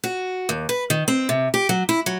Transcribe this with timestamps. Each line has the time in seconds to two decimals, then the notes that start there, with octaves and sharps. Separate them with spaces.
0.04 F#4
0.49 D#2
0.69 B4
0.90 D#3
1.08 C4
1.29 C3
1.54 G4
1.69 F#3
1.89 E4
2.06 F#3